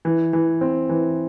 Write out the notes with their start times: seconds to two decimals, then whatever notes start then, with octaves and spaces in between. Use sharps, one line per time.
0.05 E3
0.33 E3
0.61 C4
0.89 E3